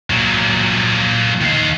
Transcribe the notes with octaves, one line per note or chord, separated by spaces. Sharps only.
A#2 F#3
D#3 F5